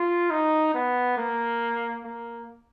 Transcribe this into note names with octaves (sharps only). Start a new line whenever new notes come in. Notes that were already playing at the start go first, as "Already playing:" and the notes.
Already playing: F4
D#4
B3
A#3
A#3